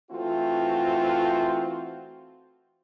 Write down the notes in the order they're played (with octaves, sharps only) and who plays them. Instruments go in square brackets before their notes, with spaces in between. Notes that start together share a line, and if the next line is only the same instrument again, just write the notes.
[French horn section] E3 A3 C4 F4 F#4